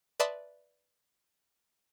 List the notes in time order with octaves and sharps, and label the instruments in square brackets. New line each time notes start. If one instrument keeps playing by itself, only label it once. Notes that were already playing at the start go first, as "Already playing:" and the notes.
[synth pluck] B4 D5 E5 A5 C6 D#6